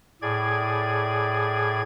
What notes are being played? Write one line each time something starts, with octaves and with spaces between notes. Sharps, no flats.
A2 G#4 D5 G#6